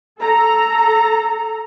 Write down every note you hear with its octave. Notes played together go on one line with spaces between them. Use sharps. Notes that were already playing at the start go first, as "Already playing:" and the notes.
A4 A#5